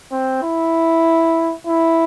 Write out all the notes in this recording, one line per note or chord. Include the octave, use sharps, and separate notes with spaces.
C4
E4
E4